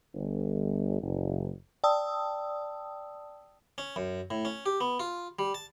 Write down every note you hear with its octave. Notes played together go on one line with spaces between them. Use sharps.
G1
F#1
D5 G5 A5 D#6 E6
C#4
F#2
A2
C#4
G4
B3
F4
G3
A5